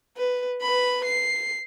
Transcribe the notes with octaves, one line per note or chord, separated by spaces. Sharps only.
B4
B4 B5
C7